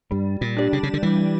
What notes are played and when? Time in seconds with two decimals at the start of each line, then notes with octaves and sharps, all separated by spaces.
0.11 G2 G3
0.41 A#2
0.57 D4 G4 D5
0.73 C#3
0.83 C#3
0.94 D3
1.03 E3 G3